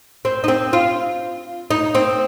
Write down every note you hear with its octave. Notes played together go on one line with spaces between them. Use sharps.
C4
D#4
C4
F4
D#4
C4